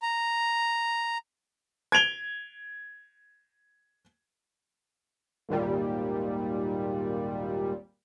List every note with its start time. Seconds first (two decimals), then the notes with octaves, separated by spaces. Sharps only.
0.02 A#5
1.92 G#6 D7 F7 G7
5.49 G#1 D#2 A#2 G3